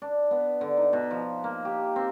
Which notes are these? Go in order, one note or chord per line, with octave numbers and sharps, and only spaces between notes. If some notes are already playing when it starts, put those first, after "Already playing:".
D4
B3
D3
D#4
B2
F3
A#3
G4
C4